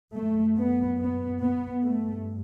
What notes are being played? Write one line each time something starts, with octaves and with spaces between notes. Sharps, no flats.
F#2 A3
B3
B3
B3
G2 A3